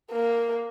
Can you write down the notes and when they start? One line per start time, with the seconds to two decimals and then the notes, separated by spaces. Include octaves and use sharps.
0.11 A#3